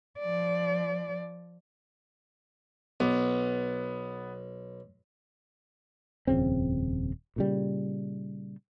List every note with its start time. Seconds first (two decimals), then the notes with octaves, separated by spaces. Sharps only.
0.20 F3 D5
3.00 B1 B3
6.27 D#1 F2 C#3 C4
7.36 A#2 C#3 G3